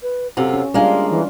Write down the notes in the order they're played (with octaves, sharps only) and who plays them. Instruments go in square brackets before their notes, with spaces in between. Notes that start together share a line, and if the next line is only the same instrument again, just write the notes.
[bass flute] B4
[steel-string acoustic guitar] F#2 C3 F4 [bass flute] A4
[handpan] C#4
[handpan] G3 D4 F4 [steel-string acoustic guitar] G#3 A#3 [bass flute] F5
[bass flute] E3